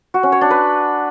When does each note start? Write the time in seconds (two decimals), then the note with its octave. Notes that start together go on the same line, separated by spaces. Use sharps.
0.14 F#4
0.23 C#4
0.32 C#5
0.41 D4
0.50 B4